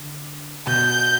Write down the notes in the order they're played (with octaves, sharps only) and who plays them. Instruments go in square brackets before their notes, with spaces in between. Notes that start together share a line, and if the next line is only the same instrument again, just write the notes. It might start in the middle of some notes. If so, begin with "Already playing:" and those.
Already playing: [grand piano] D3
[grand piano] B2 [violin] G6